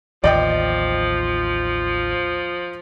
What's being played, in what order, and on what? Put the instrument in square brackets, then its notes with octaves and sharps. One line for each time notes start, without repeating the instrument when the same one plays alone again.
[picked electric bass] A1 D#2 [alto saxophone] F3 [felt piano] D5 D#5 G5